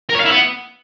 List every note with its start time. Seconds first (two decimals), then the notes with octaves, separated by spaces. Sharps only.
0.10 A#4
0.15 C#5
0.20 F5
0.26 E4
0.31 B3